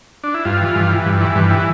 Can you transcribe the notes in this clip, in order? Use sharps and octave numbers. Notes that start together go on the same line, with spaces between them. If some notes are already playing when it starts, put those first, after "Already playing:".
D4
E4
G2 F4
E3
G2
E3
G2
E3
G2
E3